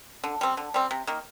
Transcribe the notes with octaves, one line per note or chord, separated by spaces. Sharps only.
D3
G3 C4
D3
G3 C4
C3
D#3 A#3